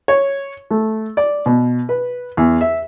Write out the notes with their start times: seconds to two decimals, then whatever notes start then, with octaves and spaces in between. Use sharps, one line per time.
0.08 C#5
0.71 A3
1.17 D5
1.46 B2
1.89 B4
2.37 E2
2.61 E5